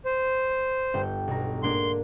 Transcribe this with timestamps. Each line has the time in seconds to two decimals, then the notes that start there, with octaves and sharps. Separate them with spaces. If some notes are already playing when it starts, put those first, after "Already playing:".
0.05 C5
0.94 G1 G5
1.28 B1 A#5
1.63 G#2 A#3 D4 C6